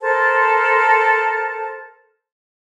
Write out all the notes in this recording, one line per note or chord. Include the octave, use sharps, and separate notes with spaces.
A4 A#4 C5 A5